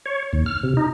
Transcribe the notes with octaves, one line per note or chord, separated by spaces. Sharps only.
C#5
D#2
F6
C3
D#4